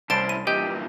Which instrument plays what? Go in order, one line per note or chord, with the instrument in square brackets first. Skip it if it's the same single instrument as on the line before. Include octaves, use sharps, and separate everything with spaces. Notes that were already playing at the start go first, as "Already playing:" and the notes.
[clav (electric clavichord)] C2 C5 [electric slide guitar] C#4 E4 [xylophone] A5 A6 D7
[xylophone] D#7
[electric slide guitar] G2 A#2 E3 [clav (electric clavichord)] G4 D#5 [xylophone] G6